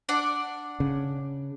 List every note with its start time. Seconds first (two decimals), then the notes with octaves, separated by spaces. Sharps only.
0.09 D4 D5 F#5
0.80 C#3